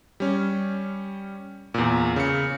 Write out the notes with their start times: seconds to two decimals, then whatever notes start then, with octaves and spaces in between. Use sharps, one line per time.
0.20 G3 C#4
1.74 E2 A#2
2.16 C#3 C#7